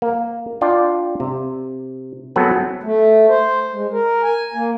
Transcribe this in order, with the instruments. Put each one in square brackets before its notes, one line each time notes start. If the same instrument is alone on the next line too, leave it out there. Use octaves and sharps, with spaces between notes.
[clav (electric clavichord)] A#3
D4 F4 D5 G5
C3
F#3 B3 C4 G#4 A4 B4
[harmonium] A3
C5
G#3
A#4
G#5
A#3